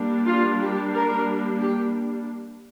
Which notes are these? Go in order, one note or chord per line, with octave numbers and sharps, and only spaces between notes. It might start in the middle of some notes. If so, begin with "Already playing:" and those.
Already playing: G3 A#3 D4
F4
G4
A#4
G4